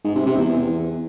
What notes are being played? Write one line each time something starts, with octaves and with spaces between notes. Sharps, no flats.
G#2
C3
C3
E2